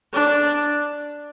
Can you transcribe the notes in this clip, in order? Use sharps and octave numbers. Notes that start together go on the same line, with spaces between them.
D4